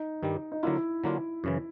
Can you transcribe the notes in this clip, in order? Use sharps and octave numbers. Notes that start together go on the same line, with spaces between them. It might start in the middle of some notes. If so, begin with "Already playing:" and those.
Already playing: D#4
G2 D#3 G3
D#4
D3 F#3 A#3 D4 E4 F4
D3 F#3 A#3 D4 F4
F#2 C#3 E3